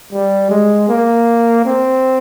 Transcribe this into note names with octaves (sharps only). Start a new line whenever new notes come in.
G3
G#3
A#3
C4